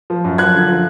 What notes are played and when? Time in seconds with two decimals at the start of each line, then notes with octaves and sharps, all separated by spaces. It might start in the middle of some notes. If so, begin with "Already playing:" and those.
0.10 F3
0.24 F#2
0.38 F3 F#6 G#6
0.54 D3
0.68 F3